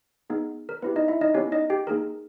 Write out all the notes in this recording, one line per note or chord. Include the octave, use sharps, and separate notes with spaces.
B3 D#4 G#4
A#4
B3 E4 G4 B4
D#4 D#5
E4 E5
D#4 D#5
B3 C#4 E4 G4 C#5
D#4 D#5
G4 G5
A#3 D#4 G#4 A#4 A#5